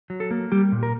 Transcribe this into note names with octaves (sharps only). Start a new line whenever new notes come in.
F#3
A4
A#3
G3 G4
A#2
A#4